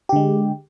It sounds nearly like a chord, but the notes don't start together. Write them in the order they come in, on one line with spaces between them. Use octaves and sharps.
G4 D3 G#3